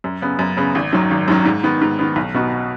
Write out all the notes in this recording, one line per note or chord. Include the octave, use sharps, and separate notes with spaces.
F#2
C#3 B3
F#2
C#3 B3
G#1
F#2 D#3 F#3
G#1
F#2 D#3 F#3
G#2
D#3 B3
G#2
D#3 B3
B1
B2 B3 D#4 F#4